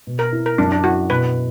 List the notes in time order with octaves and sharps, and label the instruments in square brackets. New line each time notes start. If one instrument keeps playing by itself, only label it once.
[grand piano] B2
[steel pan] A#4
[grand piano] E4
[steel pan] A#4
[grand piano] F#2 [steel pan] D4
[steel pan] D4
[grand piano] E4 [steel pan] F#4
[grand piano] B2 [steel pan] B4